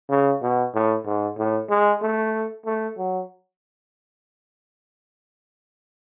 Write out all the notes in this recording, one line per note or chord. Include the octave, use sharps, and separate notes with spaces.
C#3
B2
A2
G#2
A2
G#3
A3
A3
F#3